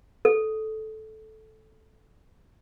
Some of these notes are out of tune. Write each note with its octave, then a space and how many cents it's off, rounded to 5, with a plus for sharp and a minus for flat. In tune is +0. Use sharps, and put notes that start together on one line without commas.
A4 -10